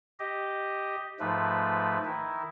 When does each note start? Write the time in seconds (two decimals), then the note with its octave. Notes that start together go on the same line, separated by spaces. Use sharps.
0.20 G4 D#5
1.20 G#2 F3 A3 B4
2.05 D#3 E4